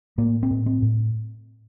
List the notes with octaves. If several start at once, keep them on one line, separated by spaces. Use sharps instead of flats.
A2 A#3
C4
A2
C4
A2